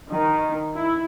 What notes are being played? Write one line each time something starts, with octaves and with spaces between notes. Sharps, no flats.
D#3
E4